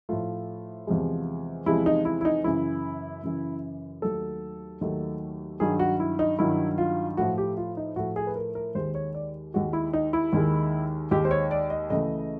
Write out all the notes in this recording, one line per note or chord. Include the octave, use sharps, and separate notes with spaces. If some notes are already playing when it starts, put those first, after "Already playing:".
A2 F3 A3 F4
E2 C3 F3 G#3
E2 C3 F3 G#3 E4
D#4
E4
E4
D#4
F#2 C#3 E3 E4
F#2 C#3 E3
D#2 D#3 F#3 A3 A4
D#2 D#3 F#3 A3
G2 D#3 F#3 G#4
F#4
E4
D#4
G2 D#3 F#3 E4
F4
A2 F3 A3 F#4
G4
F4
D#4
A2 F3 A3 F#4
G#4
B4
A#4
A#4
D#2 D#3 G#3 C5
C#5
D5
D#2 D#3 G#3 F#4
E4
D#4
E4
D#2 D#3 G#3
D#2 D#3 G#3 G4
C5
C#5
D5
D#5
C#2 C#3 E3 A3 D#5